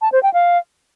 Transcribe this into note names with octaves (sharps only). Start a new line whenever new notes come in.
A5
C5
G5
F5